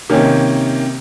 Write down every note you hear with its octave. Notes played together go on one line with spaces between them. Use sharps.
C3 D#3 A#3 C#4